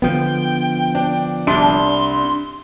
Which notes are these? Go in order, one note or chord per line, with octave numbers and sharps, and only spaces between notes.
D3 F3 B3 G5
D4
C2 D4 C6